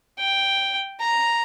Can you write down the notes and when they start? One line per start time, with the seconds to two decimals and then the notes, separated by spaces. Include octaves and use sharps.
0.18 G5
1.00 A#5